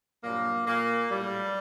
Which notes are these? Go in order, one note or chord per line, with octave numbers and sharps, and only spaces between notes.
G2 A#2 F#3 A#3
A#2 A#3
A2 F#3 G3